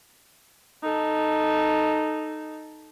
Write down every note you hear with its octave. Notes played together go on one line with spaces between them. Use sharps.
D#4 A4